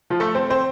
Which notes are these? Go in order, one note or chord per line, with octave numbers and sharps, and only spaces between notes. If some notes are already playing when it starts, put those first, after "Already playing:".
F3 F4
A3 A4
C4 C5
C4 C5